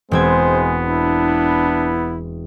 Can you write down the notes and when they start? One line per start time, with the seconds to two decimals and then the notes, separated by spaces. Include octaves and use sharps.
0.11 E1 G#3 B3 C4 C5 G#6
0.85 D4 E4